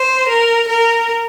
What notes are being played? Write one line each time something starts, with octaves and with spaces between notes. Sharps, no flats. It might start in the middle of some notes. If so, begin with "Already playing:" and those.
Already playing: C5
A#4
A#4